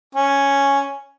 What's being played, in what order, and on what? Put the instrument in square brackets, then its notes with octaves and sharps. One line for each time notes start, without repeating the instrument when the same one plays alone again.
[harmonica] C#4